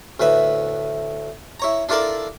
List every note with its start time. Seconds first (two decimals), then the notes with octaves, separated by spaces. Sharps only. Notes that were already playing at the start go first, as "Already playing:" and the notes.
0.20 D2 A2 B4 E5
1.60 E4 C#5 A#5
1.89 D4 E4 F4 A4 A#4 D5